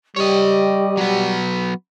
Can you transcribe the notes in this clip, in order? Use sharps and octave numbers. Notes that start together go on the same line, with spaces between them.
G3 G4 C#5 D#5
F#3 B3